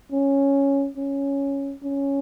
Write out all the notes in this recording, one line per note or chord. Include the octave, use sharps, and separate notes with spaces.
C#4
C#4
C#4